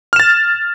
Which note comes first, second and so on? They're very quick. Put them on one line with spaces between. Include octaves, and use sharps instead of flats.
F6 E7 A6